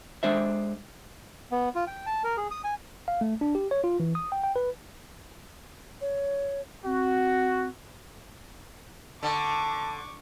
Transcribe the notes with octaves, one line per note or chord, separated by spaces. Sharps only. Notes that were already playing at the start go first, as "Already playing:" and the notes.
G#3 D4 C5 E5
B3
F4
G5
A5
A#4
G#4
D#6
G#5
F5
A3
D4
G4
C#5
F4
E3
D#6
G5
G5
B4
C#5
C4 F#4
D3 A5 C#6 D6